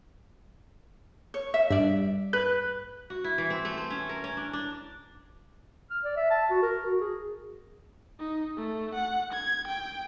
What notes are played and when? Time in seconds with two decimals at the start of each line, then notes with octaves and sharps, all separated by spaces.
1.34 C#5
1.54 E5
1.70 G2 D5 E5
2.33 B4 F#6
3.10 F#4
3.24 E4
3.38 E3
3.50 C4
3.65 A3
3.78 C5
3.90 C#4
4.09 A#4
4.24 C#4
4.37 D4
4.53 D4
5.91 F6
6.04 D5
6.17 E5
6.30 A5
6.50 F#4
6.63 A#4
6.85 F#4
7.01 G#4
8.19 D#4
8.57 A3
8.95 F#5
9.33 G#6
9.67 G5